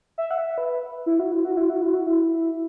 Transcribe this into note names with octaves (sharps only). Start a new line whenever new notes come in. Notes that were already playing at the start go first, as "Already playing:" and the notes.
E5
F#5
E5
B4
E4
F#4
E4
F#4
E4
F#4
E4
F#4
E4